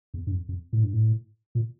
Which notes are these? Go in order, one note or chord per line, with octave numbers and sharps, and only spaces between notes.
E2
G2
F2
F2
A2
G2
A2
A#2